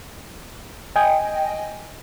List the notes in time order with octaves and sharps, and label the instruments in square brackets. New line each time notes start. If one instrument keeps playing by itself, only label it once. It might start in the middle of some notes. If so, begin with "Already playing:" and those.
[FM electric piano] D#5 G5 G#5